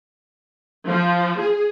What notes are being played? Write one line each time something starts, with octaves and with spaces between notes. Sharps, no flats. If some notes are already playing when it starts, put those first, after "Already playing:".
F3
G#4